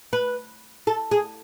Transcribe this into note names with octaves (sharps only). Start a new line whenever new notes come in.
B4
A4
G#4